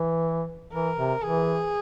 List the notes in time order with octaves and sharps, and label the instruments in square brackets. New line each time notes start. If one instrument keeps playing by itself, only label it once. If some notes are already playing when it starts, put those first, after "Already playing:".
Already playing: [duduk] E3
[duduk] E3 [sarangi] A#4
[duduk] C3
[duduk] E3 [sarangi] G#4